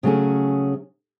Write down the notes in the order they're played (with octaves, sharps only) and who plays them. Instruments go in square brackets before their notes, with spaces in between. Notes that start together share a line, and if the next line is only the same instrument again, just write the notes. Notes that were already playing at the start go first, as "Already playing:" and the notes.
[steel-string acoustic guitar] C#3 F#3 A3 C#4 G#4